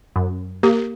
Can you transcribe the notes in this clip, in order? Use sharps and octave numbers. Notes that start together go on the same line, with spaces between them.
F#2
A#3 G4